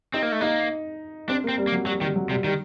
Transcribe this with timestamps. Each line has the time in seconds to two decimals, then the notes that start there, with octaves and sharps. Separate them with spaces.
0.14 C4 D#4
0.22 A#3
0.32 A3
0.41 A#3 D#4
1.29 C4 D4
1.44 A#3
1.48 C4
1.58 G3
1.67 A#3
1.72 F#3
1.86 F#3 G3
2.01 D#3 G3
2.16 F#3
2.29 C3 G3
2.44 D#3 G3